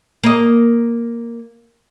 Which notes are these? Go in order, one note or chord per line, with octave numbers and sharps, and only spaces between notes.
A#3 D#5